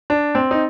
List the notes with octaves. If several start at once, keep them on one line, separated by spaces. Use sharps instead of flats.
D4
C4
D#4